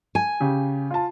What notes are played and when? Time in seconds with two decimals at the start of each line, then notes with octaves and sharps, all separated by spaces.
0.15 G#5
0.40 C#3 G4
0.91 F4 A5